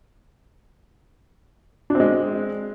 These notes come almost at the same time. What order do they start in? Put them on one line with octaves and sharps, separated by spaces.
D4 C4 G#3